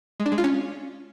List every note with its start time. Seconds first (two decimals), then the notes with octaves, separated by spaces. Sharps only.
0.20 G#3
0.26 D4
0.32 G#3
0.38 F4
0.44 C#4